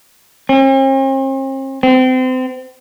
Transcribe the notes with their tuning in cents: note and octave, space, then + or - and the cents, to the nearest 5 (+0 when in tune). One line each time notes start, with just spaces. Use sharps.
C4 +45
C4 -30